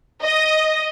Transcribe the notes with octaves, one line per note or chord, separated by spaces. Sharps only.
D#5